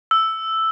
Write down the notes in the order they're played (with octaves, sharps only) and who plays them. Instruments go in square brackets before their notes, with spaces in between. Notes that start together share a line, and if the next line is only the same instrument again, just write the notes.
[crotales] E6